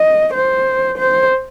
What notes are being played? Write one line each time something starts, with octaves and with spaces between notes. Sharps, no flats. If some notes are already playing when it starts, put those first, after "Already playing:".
Already playing: D#5
C5
C5